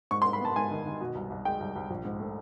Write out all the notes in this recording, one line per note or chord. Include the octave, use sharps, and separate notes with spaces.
G#2 C#6
C6
G#2
B5
B3 A5
G#2 G#5
D#3
D#3
B2
C2
C2
G#3 G5
C2
C2
A#1
G#2
A3